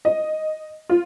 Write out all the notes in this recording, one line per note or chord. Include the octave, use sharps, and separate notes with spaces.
D#5
F4